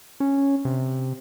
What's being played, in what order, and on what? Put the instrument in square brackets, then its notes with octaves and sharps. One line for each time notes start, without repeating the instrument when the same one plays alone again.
[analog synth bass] C#4
C3